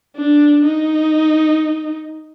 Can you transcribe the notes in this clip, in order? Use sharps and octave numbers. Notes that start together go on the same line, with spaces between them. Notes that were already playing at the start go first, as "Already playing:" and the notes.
D4
D#4